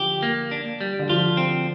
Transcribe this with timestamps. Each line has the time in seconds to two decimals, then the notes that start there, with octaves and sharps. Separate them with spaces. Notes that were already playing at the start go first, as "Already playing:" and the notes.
Already playing: D3 F3 G4
0.23 A#3
0.51 D4
0.81 G3
0.99 D3
1.09 F3 F4
1.37 C4